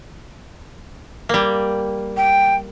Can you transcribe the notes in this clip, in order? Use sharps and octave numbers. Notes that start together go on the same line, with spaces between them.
G3 A#3
G5